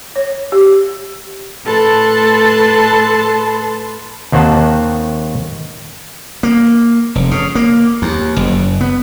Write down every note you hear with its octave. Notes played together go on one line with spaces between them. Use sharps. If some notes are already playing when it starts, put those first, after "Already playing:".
C#5
G4
A2 A4 B4 A5 C6
D#2 D#3 C4 C5 F#5 A5
A#3
F1
C#3
A#3
D#2
F#1
B3